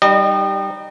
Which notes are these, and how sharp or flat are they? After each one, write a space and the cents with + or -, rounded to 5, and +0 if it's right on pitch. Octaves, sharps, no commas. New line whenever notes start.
G3 +0 D#4 -15 D#5 -35